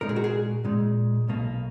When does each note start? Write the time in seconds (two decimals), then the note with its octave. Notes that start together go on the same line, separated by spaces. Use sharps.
0.01 A#2 G#3 D#4 A#4
0.09 G#4
0.16 F#4
0.24 G#4
0.64 A#2 G#3 D#4
1.28 B1 B2 A#3 D#4